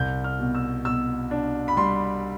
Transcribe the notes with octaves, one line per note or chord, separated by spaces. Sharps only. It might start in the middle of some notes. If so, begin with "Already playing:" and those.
Already playing: C2 G6
F6
B2
E6
B2 E6
D4
B5
G3 C6